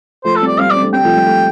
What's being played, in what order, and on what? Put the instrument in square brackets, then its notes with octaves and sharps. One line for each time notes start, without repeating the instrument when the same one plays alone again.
[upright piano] F3 A3 [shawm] C5
[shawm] A4
[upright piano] G3 C4
[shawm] D5
[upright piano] G3 C4 [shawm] F5
[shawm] D5
[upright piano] C4
A3 D4
[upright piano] G3 C4 [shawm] G5
[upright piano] F3 A3
G3
A3